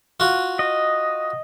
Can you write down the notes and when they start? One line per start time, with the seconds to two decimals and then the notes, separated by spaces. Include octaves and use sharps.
0.20 F4 F#4
0.59 D#5